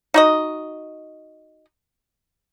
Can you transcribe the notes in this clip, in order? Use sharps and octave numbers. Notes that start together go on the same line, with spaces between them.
D#4 F#4 D#5